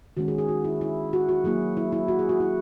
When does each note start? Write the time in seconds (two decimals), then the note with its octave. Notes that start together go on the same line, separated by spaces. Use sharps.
0.17 D#3 G#3 C#4 F#4
0.28 G#4
0.38 G#4
0.48 F#4
0.64 E4
0.81 E4
1.13 F#4
1.29 F#4
1.44 F#3 A#3 E4 G#4
1.77 E4
1.92 E4
2.08 F#4
2.19 G#4
2.29 F#4
2.40 E4